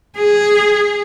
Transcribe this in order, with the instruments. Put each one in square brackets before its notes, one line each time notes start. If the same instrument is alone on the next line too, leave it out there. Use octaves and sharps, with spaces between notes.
[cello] G#4